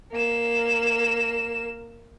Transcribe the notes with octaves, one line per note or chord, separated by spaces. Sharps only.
A#3 E7